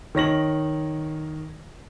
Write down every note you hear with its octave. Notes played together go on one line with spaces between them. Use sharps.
D#3 C#5 A#6 F#7